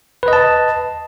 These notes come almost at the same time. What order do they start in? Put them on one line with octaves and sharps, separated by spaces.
B4 D#5 A5